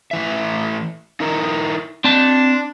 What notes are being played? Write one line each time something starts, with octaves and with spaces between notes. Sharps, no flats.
A2 E3 E5
D#4 E4 A#4
C4 D4 A5